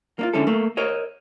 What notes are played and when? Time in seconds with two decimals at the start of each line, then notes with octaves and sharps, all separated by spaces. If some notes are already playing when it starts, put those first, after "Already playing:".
0.19 A#3 D4 F4
0.33 D3 G#3 C#4 E4 A4
0.47 A3 A#3
0.77 A#4 C#5 D#5